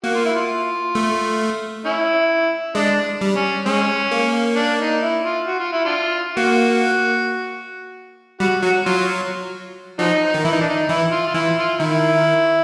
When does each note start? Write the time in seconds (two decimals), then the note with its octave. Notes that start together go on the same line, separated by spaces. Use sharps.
0.04 A#3 F#4
0.15 F4
0.25 E4
0.36 F4
0.95 A3
1.85 C#4 E4
2.75 G#3 D4
3.21 G3
3.36 C#4
3.66 G#3 C#4
4.11 A#3
4.56 D4
4.79 D#4
5.02 E4
5.24 F4
5.47 F#4
5.60 F4
5.73 E4
5.85 D4 F4
6.37 A#3 F#4
8.40 G3 F#4
8.63 F#3 F#4
8.86 F#3 F4
9.99 F3 F#3 D#4
10.34 D#3
10.44 E3 E4
10.52 D#4
10.61 D4
10.69 D#4
10.89 E3 E4
11.12 F4
11.28 F4
11.34 E3 E4
11.57 F4
11.79 D#3 E4